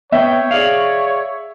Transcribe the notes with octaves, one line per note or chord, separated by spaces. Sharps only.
B3 C#5 E5 G5
G#4 D5 F5